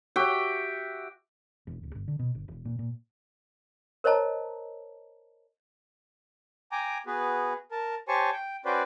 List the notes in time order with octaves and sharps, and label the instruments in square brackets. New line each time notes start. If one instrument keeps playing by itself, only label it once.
[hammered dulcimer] F#4 G4 E5 G5
[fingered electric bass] E1
D1
G1
D3
B2
G1
E1
A#2
A#2
[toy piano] A#4 C5 C#5 D#5 A5 A#5
[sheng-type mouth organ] G5 G#5 A#5 D6
B3 F#4 G#4 B4
A#4 A5
G4 C5 C#5 G#5 A5 C#6
G5
C#4 F#4 B4 C5 D5 G5